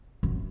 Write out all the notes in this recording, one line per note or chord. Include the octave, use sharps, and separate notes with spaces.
F#2